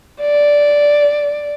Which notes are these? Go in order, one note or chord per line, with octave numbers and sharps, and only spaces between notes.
D5